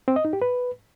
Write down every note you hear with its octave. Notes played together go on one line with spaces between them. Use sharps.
C4
D#5
D#4
G4
B4